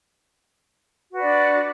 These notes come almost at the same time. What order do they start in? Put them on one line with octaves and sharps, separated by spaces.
F#4 B4 D5 D4